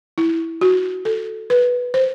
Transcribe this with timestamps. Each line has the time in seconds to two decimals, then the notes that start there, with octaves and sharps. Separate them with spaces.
0.18 E4
0.61 F#4
1.05 A4
1.50 B4
1.94 C5